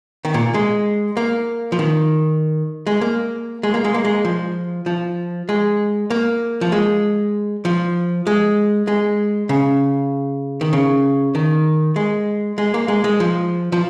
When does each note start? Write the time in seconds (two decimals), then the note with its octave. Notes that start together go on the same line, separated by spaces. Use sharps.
0.25 D#3
0.34 A#2
0.54 G#3
1.17 A#3
1.72 F3
1.79 D#3
2.87 G#3
3.01 A#3
3.63 G#3
3.74 A#3
3.84 G#3
3.94 A#3
4.05 G#3
4.25 F3
4.86 F3
5.49 G#3
6.10 A#3
6.61 F3
6.72 G#3
7.65 F3
8.27 G#3
8.88 G#3
9.49 C#3
10.61 D#3
10.73 C#3
11.35 D#3
11.96 G#3
12.58 G#3
12.74 A#3
12.88 G#3
13.04 G#3
13.20 F3
13.72 F3